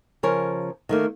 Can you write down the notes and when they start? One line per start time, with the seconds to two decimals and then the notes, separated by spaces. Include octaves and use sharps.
0.23 C#3 F3 A#4 C#5
0.89 D#3 A3 A#3